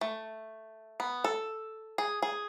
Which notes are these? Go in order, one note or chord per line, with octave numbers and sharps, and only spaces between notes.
A3
B3
A4
G#4
G#4